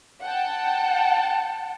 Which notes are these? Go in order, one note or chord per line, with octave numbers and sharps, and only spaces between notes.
F#5 G5 A5